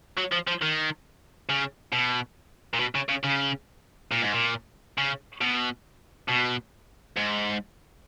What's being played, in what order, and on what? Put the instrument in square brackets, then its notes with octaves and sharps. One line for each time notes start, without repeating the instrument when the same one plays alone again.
[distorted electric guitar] F#3
F3
F3
D#3
C#3
B2
A#2
B2
C#3
C#3
C#3
A#2
G#2
A#2
C#3
B2
B2
G#2